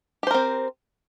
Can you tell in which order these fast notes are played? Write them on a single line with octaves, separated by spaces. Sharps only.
G4 C5 A#4 C4